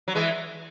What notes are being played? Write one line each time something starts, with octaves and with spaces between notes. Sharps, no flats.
F#3
E3 G#3